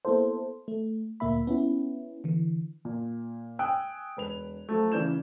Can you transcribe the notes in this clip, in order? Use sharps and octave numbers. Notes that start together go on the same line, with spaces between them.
A#3 B3 E4 A4 C5
A3
D2 A#2 A#3 E5 B5
B3 C#4 E4
D3 E3
A#2
G5 G#5 D#6 E6 F#6
E1 B4 F7
F3 F#3 A3
C#3 E3 D5 G6 E7